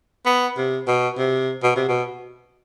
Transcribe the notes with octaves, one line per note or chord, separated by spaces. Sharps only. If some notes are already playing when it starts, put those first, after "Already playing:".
B3
C3
B2
C3
B2
C3
B2